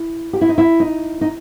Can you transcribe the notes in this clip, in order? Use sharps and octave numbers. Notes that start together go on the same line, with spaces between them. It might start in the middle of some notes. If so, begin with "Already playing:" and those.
Already playing: E4
G4
E4
D#4
E4
D#4
D#4